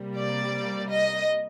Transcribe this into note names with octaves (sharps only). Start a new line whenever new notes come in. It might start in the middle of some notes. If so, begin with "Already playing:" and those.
Already playing: C3 G3 A#3
D5
D#5